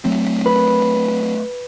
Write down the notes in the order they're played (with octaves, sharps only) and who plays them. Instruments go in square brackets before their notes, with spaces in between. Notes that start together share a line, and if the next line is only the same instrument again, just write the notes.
[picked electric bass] F#3 A3 C4
[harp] B4